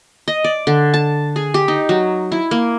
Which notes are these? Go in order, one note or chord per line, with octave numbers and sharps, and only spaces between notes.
D#5
D5
D3
A5
G#4
G4
D#4
F#3
E4
A#3